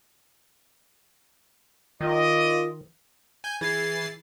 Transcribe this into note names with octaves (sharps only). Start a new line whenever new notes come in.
D#3 F4 D5 D#5
G#5 G6
E3 G#4 A6 C7